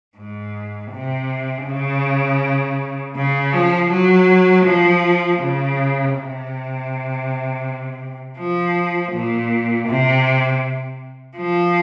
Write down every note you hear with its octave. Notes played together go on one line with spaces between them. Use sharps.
G#2
C3
C#3
C#3
F3
F#3
F3
C#3
C3
F3
A#2
C3
F3